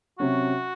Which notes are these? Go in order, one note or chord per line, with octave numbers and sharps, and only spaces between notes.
C3 F#3 C#4 F#4